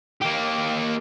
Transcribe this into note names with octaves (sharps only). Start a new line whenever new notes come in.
A#3 G4